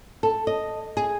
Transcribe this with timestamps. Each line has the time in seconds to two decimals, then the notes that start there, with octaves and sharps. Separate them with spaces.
0.23 A4
0.47 D#5
0.97 G#4